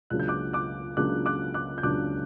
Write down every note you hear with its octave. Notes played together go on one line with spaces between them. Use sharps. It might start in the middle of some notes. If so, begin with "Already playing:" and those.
C#2 C#3 F#3 A#3 D4 F#6
G6
D6 F#6
D6 F#6
C#2 C#3 F#3 A#3 D4 D6 F#6
D6 F#6
D6 F#6
G6
C#2 C#3 F#3 A#3 D4 D6 F#6